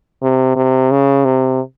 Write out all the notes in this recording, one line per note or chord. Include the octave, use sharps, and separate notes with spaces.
C3
C3
C#3
C3